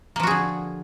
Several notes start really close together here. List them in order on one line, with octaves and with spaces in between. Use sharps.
A#3 F3 F#4 G#4 D3